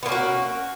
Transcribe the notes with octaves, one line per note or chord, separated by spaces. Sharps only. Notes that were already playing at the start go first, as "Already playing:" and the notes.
A#3 B3 C#4 F#4